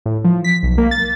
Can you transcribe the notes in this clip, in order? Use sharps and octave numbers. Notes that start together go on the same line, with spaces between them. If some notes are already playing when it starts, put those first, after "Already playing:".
A2
F3
B6
B1
A#3
A6